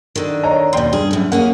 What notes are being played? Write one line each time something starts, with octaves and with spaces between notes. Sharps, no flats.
D3 D#3
C#5 D#5 A#5
D#2 B2 D5 G5 C6
G2 G#4
F#2 A2
A#3 C#4 G#4 F#5